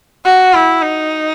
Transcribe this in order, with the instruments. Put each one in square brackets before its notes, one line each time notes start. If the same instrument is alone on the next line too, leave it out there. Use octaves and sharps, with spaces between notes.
[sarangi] F#4
E4
D#4